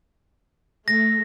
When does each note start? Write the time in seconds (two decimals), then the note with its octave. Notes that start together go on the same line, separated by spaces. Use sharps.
0.88 A3 A#6